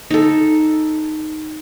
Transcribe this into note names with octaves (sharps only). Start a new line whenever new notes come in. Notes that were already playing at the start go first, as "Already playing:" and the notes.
D#4 A4